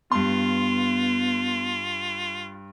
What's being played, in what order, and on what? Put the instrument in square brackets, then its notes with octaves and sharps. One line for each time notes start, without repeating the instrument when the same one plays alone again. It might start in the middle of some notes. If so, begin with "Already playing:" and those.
[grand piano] G2 C6 [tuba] B3 [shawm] F4